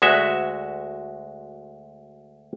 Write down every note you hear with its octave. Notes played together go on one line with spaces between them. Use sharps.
D2 G#3 F#4 E5